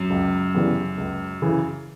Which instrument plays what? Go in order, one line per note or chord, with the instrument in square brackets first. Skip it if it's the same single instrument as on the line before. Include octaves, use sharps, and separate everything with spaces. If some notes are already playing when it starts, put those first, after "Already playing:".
Already playing: [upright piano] F#2
[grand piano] C#2
C#3 E3 G3 B3
C#2
C#3 E3